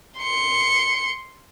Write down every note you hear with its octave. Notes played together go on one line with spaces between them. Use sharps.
C6 C#7